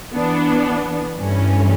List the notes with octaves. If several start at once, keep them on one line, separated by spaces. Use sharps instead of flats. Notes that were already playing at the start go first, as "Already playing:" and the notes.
E3 B3 D4
G2 E3 A3 C#4